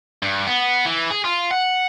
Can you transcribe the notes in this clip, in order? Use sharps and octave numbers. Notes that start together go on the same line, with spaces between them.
G2
B3
E3
G#4
F4
F#5